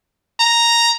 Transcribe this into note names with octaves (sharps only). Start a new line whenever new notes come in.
A#5